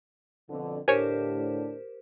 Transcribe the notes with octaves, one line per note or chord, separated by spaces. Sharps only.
F2 B2 D3
A2 D3 D4 G4 A#4 C5 C#5 G#5